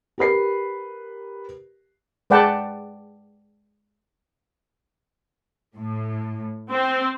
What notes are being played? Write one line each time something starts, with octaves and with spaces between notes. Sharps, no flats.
G4 A#4 B4 C7
G#3 B4 D5 F#5 G5 A5
A2
C4